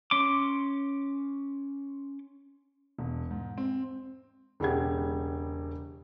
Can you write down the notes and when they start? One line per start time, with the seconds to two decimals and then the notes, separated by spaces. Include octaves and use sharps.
0.11 C#4 C6 D6
2.99 E1
3.31 G#2
3.58 C4
4.60 E1 C#3 G#3 G4 F#5 G#6